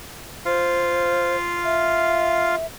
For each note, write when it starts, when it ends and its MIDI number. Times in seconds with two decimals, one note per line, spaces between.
0.46 2.55 65
0.46 1.36 72
0.46 2.55 77
1.65 2.66 76